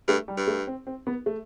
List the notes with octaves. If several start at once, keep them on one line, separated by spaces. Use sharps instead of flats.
G2 A3
G3
G2
A3
C4
C4
B3
A3